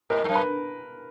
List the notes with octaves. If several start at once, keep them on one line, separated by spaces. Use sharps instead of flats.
G#2 A#4
G2
F#2
B4